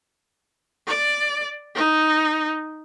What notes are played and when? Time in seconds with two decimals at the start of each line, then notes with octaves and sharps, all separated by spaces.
0.87 D5
1.75 D#4